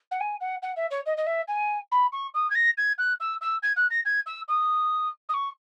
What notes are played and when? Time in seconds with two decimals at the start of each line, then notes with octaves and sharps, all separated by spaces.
0.11 F#5
0.20 G#5
0.41 F#5
0.62 F#5
0.76 E5
0.91 C#5
1.06 D#5
1.17 D#5
1.27 E5
1.48 G#5
1.92 B5
2.12 C#6
2.34 D#6
2.50 G#6
2.55 A#6
2.78 G#6
2.98 F#6
3.20 E6
3.41 E6
3.63 G#6
3.77 F#6
3.91 A#6
4.05 G#6
4.26 E6
4.48 D#6
5.29 D#6
5.34 C#6